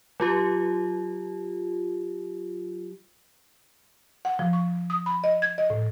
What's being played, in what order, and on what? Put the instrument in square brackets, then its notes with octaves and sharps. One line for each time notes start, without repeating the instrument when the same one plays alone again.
[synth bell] F#3 F4 G4
[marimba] F#5
F3
C#6
D#6
B5
D#5
G#6
D#5
A2